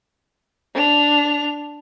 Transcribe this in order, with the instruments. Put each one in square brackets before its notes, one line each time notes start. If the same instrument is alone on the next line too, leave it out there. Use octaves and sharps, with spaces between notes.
[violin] D4 F7